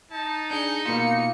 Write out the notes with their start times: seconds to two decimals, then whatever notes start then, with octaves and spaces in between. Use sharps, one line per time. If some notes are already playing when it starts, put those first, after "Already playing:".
0.11 D#4 A5
0.51 D4 G#4 G6 C#7
0.85 B2 A#3 F4 C#7